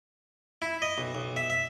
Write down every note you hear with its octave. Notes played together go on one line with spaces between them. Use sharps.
E4
D#5
B1
B1
E5
E5